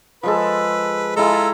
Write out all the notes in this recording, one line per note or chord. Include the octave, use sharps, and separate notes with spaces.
F3 G#3 A4 B4
G#3 E4 F4 A4 A#5